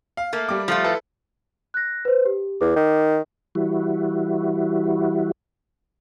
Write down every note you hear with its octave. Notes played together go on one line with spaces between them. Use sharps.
F5
A3 A#3
G3 D6
F3 A3 F4
E4 A4 B4
F#6 A#6
B4 C5
G4
E2 D6
D#3
E3 G3 E4 F#4